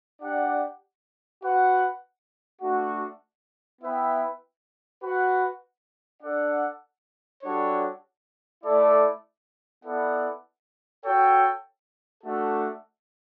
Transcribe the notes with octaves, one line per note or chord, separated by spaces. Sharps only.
D4 G4 D5 F#5
F#4 B4 F#5
A3 D4 F#4
B3 E4 B4 E5 G5
F#4 B4 F#5
D4 A4 D5 F#5
G3 D4 F#4 A4 C#5
A3 E4 A4 D5
B3 E4 A4 D5 F#5
F#4 A4 C#5 G5
A3 D4 F#4 A4